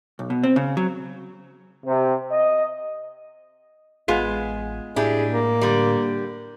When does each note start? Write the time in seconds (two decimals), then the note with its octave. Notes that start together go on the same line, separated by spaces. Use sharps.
0.19 B1
0.30 B2
0.43 C4
0.56 C#3
0.77 F#3
1.86 C3
2.31 D#5
4.08 A1 G#3 B3 F4
4.96 A2 D4 E4 G4 G#4
5.32 A#3
5.61 D3 G3